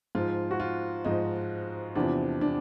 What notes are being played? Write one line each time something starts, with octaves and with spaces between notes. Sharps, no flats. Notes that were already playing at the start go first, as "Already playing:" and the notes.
G#2 F3 F4
F#4
F4
G#2 F3 D#4
E2 C3 F3 D4
D4